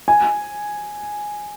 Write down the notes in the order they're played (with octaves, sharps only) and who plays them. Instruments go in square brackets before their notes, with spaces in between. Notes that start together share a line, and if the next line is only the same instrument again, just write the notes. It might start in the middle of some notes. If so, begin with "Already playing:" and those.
[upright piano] G#5